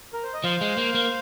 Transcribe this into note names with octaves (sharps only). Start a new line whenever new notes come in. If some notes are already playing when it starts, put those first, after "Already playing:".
A#4
C5
D#5
F3 C5 F5
G#3
A#3
A#3